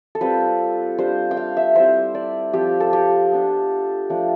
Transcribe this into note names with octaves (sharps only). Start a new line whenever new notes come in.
A4
G3 C4 F4 B4
G3 D4 F4 C5
G5
F5
E5
G3 C4 E4 C5
D5
F3 C4 F4 G4
A4
G4
B3 D4 F4
F3 A3 D4